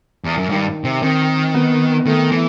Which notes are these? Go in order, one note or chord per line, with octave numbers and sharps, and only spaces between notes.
E2
F#2
G2 D#3
C3
D#3 C4
B3
D#3 A3
E3